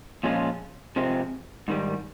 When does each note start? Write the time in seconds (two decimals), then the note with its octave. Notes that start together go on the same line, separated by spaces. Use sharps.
0.23 A#2 F3 G#3 C#4 F4
0.96 C3 F3 G#3 C4
1.68 G#2 D#3 G3